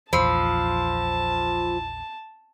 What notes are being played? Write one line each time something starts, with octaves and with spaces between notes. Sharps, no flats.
A#1 E2 F3 A5 B5 E6 C7